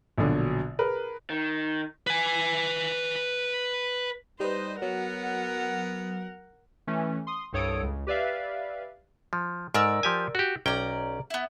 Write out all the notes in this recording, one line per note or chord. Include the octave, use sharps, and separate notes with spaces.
A#1 B2 D3 F#3
G#4 A#4 B4
D#3
B4 G#5
G3 D#4 B4 C5 D#5
F#3 B3 A#4 F#5
E3 A3 C#4
C6 D#6
C2 G2 A4 C#5 D#6 D7
C#2
G4 B4 D5 E5 F5
F3
G#2 A#4 D5 E6
F3 G4 G#5
F#4 G4
B1 C#4 D5 G5 A#5
B3 E4